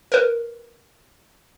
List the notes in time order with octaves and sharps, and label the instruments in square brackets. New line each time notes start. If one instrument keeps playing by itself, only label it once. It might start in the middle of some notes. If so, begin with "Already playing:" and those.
[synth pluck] A#4 B4